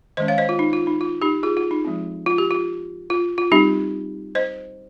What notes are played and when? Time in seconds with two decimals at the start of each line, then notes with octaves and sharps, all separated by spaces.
0.17 D#3 G#3 C#4 C5 D#5
0.28 C#5 F5
0.38 C5 D#5
0.49 F4
0.59 D#4
0.73 F4
0.87 D#4
1.01 F4
1.22 D#4 G4
1.43 F4 G#4
1.57 F4
1.71 D#4
1.85 F3 G#3 C4
2.26 F4
2.38 G4
2.51 F4
3.10 F4
3.38 F4
3.52 G3 C4 D#4 G4
4.35 C5 D#5